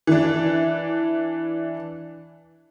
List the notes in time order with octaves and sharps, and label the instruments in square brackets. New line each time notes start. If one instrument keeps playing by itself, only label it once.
[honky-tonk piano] E3 D4